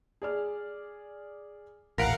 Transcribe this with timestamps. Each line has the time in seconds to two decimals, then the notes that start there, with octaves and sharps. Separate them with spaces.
0.22 G#4 D5 F6
1.98 D#1 A1 A#4 F5 F#5 A#6 B6 D7